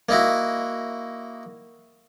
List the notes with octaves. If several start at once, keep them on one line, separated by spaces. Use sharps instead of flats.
A#3 D#4 E4 F#4